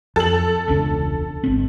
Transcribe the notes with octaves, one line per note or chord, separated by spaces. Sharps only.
F2 A4 F#7
E1 C#2 D4
G#1 C4